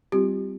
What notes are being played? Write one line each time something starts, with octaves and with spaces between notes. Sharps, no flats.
G3 C4 F4 G4